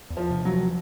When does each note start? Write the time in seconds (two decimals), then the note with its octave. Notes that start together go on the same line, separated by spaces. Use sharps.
0.10 E2
0.17 F3
0.30 C3
0.45 F#3
0.52 F3